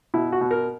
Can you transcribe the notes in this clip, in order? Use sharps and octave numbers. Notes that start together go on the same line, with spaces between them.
B2 E4
F#4
B2
A#4